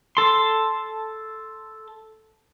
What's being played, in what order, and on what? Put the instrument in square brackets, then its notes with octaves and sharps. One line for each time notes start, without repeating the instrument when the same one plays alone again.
[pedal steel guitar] A4 C6